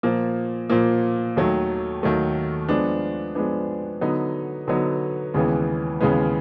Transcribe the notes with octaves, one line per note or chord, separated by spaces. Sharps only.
A#2 F3 A#3
A#2 F3 A#3
D#2 D#3 F#3 A3
D#2 D#3 F#3 A3
F3 G#3 B3 D4
F3 G#3 B3 D4
D3 F#3 B3 D#4
D3 F#3 B3 D#4
D#2 C#3 E3 G#3 B3
D#2 C#3 E3 G#3 B3